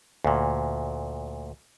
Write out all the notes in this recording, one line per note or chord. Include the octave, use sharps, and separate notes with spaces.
D2 A#2